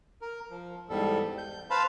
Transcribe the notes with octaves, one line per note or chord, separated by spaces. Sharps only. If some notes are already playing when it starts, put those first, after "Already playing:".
A#4
F3
E2 G#2 G3 A4
G6
B4 C5 F5 A5 B5